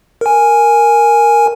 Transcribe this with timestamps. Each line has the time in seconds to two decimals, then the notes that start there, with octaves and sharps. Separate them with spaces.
0.21 A#4 G#5